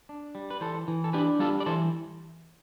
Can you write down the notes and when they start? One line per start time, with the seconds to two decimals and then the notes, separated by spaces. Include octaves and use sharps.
0.09 D4
0.35 G3
0.50 B4
0.61 E3 A4 C5
0.88 E3
1.04 A4
1.13 D4 G4 B4
1.40 G3 F4 A4
1.60 D5
1.66 E3 A4 C5